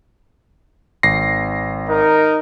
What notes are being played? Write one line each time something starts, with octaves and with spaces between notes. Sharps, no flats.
G#1 A#6 C7
D#4 A#4